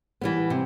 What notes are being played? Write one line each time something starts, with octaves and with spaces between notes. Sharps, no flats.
E3 G3 B3
C3